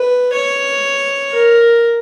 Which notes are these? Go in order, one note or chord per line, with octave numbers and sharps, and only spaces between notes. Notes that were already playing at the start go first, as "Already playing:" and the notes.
Already playing: B4
C#5
A#4